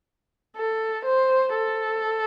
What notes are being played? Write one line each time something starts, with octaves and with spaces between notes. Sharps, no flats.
A4
C5
A4